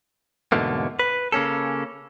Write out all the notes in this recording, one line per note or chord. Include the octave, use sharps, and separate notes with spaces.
E2 G#2 B2 D3 A3 A#3
B4
C#3 A#3 C#4 A4